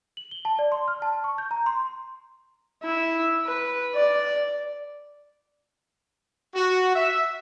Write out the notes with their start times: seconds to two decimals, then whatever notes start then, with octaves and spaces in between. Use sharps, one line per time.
0.17 F#7
0.31 G7
0.45 A5
0.59 D5
0.72 C6
0.88 F6
1.02 A5
1.24 C#6
1.38 G6
1.51 A#5
1.66 C6
2.84 E4
3.45 B4
3.95 D5
6.55 F#4
6.95 E5